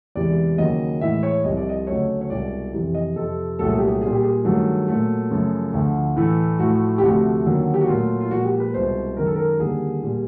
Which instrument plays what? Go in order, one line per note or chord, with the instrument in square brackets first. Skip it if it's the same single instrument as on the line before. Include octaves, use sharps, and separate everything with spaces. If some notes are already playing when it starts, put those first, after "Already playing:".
[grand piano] E2 C3 E3 G#3 D5
D#2 C#3 F#3 D#5
A2 E3 G#3 E5
C#5
C2 C3 F3 D#5
D5
D#5
D2 C#3 F#3 A3 C#5
C#5
C2 B2 G#3 D5
F2 C3 E3
D#5
F2 C3 F3 A4
C2 A#2 F#3 A3 A4
G#4
G4
G#4
A#2 G3 G#4
G4
G#4
G2 D#3 F#3 A3
A#2 F#3 A3
F#2 C#3 F3 A3
D2 D3 F3
A2 E3 A3
A2 F3 A3 F#4
G4
D2 C3 F3 A3 F#4
D#2 D3 F#3
G4
F#4
A#2 F#3 A3 F4
F4
A#2 F3 G#3 F#4
G4
B4
C2 B2 G#3 C5
F#2 D#3 G#3 A#4
A4
A#4
D#2 D3 G3 G#4
A#2 G3